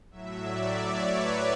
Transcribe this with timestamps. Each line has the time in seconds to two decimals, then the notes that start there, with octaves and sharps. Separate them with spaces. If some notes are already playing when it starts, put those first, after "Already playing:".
0.11 A2 F#3 E5
0.45 D5
0.78 C#5
1.12 B4